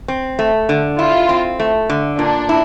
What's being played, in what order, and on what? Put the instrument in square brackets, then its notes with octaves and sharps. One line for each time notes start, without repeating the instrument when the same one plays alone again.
[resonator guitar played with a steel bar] C4
A3
D3
[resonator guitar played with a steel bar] E4 [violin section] F4
[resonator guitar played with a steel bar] C4
A3
D3
[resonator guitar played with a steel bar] A#2 [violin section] D4
[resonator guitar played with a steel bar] E4